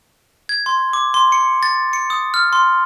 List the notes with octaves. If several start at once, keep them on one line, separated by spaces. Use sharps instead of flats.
G#6
C6
D6
C6
C#7
A6
C#7
D#6
F6
C6